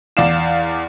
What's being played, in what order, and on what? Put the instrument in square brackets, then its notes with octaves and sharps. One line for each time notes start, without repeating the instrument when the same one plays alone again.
[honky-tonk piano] E2 D5 F5 E7